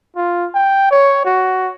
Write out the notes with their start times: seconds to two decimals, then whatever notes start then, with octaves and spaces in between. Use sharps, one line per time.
0.17 F4
0.54 G5
0.91 C#5
1.25 F#4